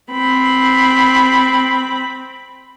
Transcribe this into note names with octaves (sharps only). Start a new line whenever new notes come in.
C4 B5